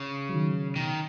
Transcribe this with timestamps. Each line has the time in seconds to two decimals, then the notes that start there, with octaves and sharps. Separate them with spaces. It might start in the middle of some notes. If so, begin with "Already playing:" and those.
Already playing: C#3
0.29 D#3 F#3
0.76 B2 D#3